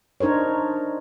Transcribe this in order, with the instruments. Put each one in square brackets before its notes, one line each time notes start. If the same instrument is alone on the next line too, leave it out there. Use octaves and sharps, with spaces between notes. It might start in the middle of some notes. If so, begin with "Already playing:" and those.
[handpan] D4 D#4 A#4 C5 C#5